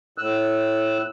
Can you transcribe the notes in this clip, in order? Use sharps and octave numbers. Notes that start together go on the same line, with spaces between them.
A2 E6 F#6